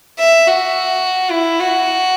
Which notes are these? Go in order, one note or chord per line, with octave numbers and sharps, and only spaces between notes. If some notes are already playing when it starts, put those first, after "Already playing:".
E5
F#4
E4
F#4